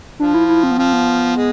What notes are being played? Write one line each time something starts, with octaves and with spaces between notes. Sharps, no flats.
F3 D4
E4
E4
C4
B3
F3 C4
B3
G#3